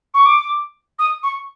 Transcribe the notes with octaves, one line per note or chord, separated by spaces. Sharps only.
C#6
D6
D#6
C#6